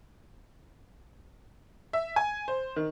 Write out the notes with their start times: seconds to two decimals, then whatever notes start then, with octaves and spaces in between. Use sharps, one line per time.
1.93 E5
2.16 G#5
2.48 C5
2.76 D#3